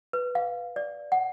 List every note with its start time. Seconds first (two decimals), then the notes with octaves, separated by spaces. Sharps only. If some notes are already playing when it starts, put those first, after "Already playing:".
0.13 B4
0.35 F5
0.76 D5
1.12 F#5